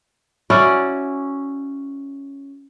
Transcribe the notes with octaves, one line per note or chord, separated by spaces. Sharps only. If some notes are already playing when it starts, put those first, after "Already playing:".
C#4 E4 F#4 D5